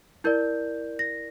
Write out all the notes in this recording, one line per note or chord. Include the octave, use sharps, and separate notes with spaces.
E4 A#4 D5 G6
A#6